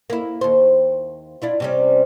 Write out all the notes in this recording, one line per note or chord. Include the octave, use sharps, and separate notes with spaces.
A#3 E4
D#2 C5
D4 E4 F4
C3 G3 C#4